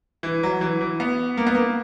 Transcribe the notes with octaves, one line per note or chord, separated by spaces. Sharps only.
E3
F#3
E3
E3
B3
A#3
B3
A#3